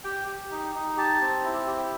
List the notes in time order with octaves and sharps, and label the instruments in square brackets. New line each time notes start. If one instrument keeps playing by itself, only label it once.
[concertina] G4 G5
G4
D#4
D#4
G4 A5
C4
E4
G4